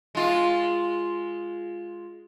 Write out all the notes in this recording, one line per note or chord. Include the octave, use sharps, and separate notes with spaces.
G#3 F4